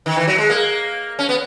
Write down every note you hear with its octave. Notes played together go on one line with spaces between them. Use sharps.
D#3
E3
F#3
G#3
A#3
C#4
B3